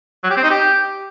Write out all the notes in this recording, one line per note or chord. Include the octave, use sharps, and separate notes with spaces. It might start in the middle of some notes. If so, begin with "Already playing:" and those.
F#3
G4
C4
D#4
G4